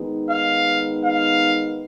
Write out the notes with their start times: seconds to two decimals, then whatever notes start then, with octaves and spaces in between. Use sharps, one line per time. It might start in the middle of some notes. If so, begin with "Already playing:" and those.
Already playing: D#3 G#3 B3 D#4
0.30 F5
1.05 F5